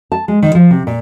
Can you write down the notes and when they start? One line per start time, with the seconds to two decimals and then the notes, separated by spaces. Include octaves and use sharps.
0.12 A5
0.28 G#3
0.42 D#3
0.55 F3
0.71 C3
0.87 A#2